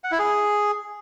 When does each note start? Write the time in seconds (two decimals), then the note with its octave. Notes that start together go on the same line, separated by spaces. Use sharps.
0.04 F#5
0.11 E4
0.19 G#4